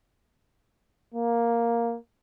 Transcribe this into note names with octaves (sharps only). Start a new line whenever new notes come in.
A#3